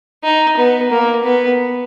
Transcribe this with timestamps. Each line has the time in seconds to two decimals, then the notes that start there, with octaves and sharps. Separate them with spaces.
0.24 D#4
0.57 B3
0.91 A#3
1.24 B3